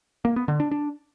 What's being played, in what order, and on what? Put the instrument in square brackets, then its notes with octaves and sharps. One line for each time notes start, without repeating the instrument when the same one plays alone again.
[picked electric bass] A#3
B3
D3
D4
D4